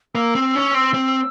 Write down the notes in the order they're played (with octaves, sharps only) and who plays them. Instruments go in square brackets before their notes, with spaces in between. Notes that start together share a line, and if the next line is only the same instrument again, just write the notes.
[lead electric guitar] A#3 [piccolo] E6
[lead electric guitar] C4
C#4
C4
C4